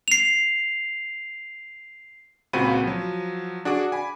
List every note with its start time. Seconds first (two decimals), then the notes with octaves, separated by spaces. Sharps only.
0.08 C7 F7
2.53 C#2 A#2 C4 F#4 B5 D#7
2.83 F3 F#3
3.65 D4 F#4 G#4 D6
3.92 G#5 B5